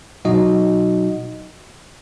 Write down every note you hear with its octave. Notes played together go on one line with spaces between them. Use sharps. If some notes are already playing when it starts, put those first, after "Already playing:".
B2 F#3 D#4 F#4 D#5